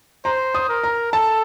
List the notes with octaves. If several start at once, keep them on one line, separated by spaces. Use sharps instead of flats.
C5 A#5
D#6
A#4
A#5
A4 A5